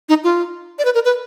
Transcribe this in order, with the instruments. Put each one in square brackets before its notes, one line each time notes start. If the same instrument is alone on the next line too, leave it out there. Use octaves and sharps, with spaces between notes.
[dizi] D#4
F4
D5
B4
A#4
B4